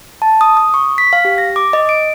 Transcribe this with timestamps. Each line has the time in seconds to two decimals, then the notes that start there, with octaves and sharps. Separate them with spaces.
0.22 A5
0.41 D#6
0.57 D#6
0.74 C#6
0.98 B6
1.13 F5
1.25 G4
1.38 A#6
1.56 D6
1.73 D#5
1.89 D7